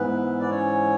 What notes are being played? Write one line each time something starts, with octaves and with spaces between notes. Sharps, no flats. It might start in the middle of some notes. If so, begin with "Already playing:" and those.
Already playing: G#2 E3 B3 B4
D5
C#4 C#5